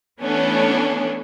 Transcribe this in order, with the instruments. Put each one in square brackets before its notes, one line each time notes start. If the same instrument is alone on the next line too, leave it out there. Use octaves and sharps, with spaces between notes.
[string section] E3 A3 B3 C#4 D4